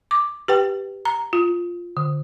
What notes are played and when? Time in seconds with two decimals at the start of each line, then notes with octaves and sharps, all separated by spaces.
0.11 D6
0.48 G4 B4 G5
1.05 A#5
1.33 F4
1.97 D3